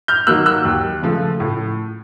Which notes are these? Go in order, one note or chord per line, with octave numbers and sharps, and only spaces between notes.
F6 G6
D#3 F#3 A#3 E6 F#6
E6 F#6
D#2
C#3 F3 A3
A2